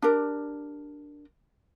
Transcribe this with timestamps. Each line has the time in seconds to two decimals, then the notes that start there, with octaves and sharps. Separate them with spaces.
0.02 D4 G4 A#4